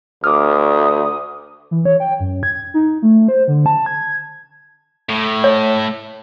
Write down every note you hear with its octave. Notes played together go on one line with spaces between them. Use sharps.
D2 D6 D#6 F6
E3
C#5
G5
F#2
G#6
D#4
A3
C5
D3
A5
G#6
A2
C#5